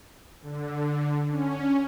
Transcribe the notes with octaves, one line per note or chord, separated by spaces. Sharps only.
D3
C#4